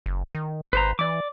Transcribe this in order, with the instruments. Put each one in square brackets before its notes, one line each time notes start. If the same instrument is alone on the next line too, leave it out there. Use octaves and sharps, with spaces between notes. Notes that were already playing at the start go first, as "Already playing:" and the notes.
[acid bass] F#1
D#3
[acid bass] G#1 [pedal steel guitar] B4 C5 A#5
[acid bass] E3 [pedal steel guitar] D5 D6